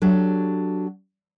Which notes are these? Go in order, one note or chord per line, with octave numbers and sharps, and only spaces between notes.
F#3 D4 F#4 G4 A4 C#5